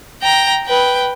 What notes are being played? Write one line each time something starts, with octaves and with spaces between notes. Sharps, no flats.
G5 A#5
B4 G5